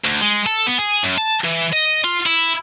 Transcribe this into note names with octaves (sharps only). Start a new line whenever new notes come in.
D2
G#3
A4
B3
G#4
F#2
A5
E3
D#5
F4
E4